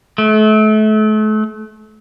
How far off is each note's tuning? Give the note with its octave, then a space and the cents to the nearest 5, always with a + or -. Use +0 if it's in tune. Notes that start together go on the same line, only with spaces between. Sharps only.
A3 -35